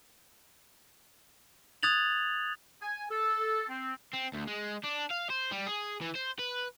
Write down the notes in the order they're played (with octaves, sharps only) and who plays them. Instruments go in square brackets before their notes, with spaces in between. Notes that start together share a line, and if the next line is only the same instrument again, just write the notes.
[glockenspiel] D#6 F#6 G#6 A6 F7 F#7
[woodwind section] G#5
A4
C4
[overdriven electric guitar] C4
D2
G#3
D4
F5
C5
G3
G#4
E3
C5
B4